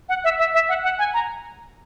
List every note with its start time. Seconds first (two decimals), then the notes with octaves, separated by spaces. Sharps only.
0.09 F#5
0.24 E5
0.39 E5
0.54 E5
0.69 F#5
0.83 F#5
0.99 G#5
1.14 A#5